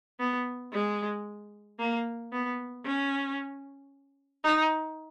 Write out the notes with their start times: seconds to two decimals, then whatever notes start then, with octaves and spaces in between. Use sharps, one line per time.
0.20 B3
0.73 G#3
1.79 A#3
2.32 B3
2.85 C#4
4.44 D#4